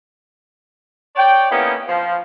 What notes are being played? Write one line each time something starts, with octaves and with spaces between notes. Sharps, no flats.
C#5 D5 G5
A#3 B3 C#4 D#4 E4 G#4
F3